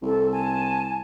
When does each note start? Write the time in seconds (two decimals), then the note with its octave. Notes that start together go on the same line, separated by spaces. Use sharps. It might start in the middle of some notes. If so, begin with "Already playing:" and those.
0.03 C2 A4
0.31 G#5 A5